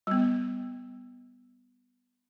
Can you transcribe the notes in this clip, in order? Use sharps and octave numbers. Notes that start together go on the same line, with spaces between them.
G3 B3